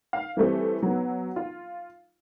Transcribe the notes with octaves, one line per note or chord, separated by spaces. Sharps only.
F5
E3 G3 A3 C4
F#3 B3
F4